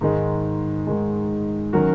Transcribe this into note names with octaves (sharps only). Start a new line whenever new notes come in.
G#2 D#3 G#3
G#2 D#3 G#3
D#3 F#3 C#4 F#4 A#4